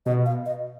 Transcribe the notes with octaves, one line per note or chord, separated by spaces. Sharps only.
B2 D#5
F5
D#5